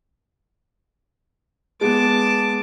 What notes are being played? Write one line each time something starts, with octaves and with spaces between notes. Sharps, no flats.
G#3 B3 A5 D6